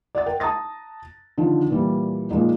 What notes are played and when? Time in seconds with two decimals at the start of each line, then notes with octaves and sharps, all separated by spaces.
0.15 D5 F#5 A6
0.26 A#4 G5
0.40 A5 A#5 D#6 A6 A#6
1.38 D3 D#3 F3
1.70 A#2 E3 G3
2.31 A#2 F3 G#3 D#4